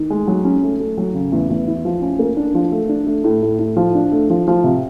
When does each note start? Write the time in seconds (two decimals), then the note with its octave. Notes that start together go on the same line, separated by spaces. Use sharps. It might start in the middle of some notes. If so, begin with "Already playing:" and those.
Already playing: D#3
0.10 G#3
0.28 F#3
0.45 C#4
0.63 A3
0.79 A3
0.98 F#3
1.14 C#3
1.32 E2
1.50 E2
1.67 E4
1.85 F3
2.02 C#4
2.19 A#3
2.37 D4
2.55 F3
2.72 A3
2.89 D4
3.07 A3
3.24 A2
3.43 A2
3.59 A2
3.77 F3
3.95 D4
4.12 A3
4.30 F3
4.48 F3
4.64 C3